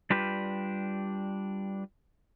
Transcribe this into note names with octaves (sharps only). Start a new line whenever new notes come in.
G3 D4 F4 G4 B4